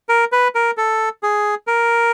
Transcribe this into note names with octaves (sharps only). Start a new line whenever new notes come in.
A#4
B4
A#4
A4
G#4
A#4